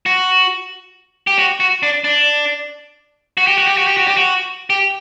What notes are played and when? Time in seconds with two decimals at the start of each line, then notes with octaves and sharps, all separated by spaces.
0.06 F#4
1.27 G4
1.39 F#4
1.60 F#4
1.83 D4
2.04 D4
3.37 F#4
3.47 G4
3.58 F#4
3.67 G4
3.77 F#4
3.87 G4
3.97 F#4
4.07 G4
4.17 F#4
4.70 G4